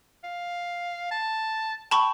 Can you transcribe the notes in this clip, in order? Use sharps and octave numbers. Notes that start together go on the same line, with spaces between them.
F5
A5
G5 A5 B5 C#6